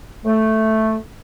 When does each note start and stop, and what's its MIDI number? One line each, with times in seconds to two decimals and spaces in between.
0.24 0.97 57